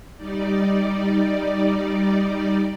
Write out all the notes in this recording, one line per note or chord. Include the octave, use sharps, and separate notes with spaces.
G3 D#4 D5